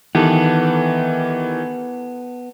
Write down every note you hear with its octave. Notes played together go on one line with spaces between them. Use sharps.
D#3 E3 B3 G4 A4